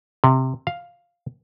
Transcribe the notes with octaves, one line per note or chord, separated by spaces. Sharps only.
C3
F5